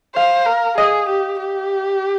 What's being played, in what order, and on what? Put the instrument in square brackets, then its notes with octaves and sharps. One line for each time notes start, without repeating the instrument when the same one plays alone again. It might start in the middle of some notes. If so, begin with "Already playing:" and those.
[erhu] C5 [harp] F5
[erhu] A#4
[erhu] G#4 [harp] D#5
[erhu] G4
G4